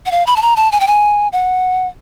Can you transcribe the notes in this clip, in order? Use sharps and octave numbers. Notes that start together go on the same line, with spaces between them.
F#5
F5
B5
A5
A#5
A5
G#5
G5
G#5
F#5